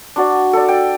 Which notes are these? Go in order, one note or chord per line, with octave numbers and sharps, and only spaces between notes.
D4 F#4 D5
A4 D5
G5